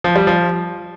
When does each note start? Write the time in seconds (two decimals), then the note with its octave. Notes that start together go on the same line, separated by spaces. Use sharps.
0.04 F3
0.16 G3
0.27 F3